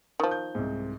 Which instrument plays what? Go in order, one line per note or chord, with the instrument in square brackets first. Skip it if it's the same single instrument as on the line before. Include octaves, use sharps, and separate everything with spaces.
[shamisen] D#3 F3
[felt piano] G6
C2 G#2